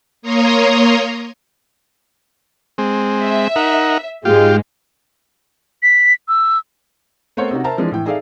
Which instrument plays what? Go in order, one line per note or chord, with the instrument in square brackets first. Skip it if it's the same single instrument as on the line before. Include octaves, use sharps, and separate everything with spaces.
[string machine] A#3 C#5 A#5 C6 D#6
[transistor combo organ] G#3 C4
[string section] E5
[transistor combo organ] D#4 A#4 F#5
[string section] G#2 G#3 [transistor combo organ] F4 G4
[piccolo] B6
E6
[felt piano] A3 B3 C4 A#4 C5 C#5
C3 C#4 D#4 F#4
A#4 C5 E5 A5 A#5
E3 F3 G#3 D4
A2 E3 G5
D#4 G#4 A4 D5 E5 F5